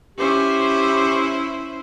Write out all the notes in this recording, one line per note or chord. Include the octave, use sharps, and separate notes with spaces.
C#4 E4 G4 C5